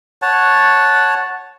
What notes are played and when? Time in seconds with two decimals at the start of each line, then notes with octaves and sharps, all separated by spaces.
0.22 C#5 F#5 A5